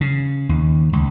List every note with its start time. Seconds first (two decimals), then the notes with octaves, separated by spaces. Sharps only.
0.01 C#3
0.49 D#2
0.93 C#2